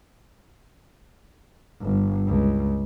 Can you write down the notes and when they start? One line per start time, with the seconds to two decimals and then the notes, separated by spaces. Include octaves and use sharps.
1.82 G1
2.27 C#2